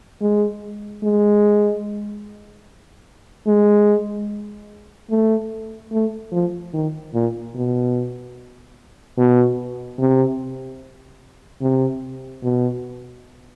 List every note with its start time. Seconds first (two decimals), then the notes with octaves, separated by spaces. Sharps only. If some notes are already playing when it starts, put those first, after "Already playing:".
0.21 G#3
1.04 G#3
3.47 G#3
5.10 A3
5.92 A3
6.32 F3
6.73 D#3
7.14 A#2
7.55 B2
9.18 B2
9.99 C3
11.61 C3
12.43 B2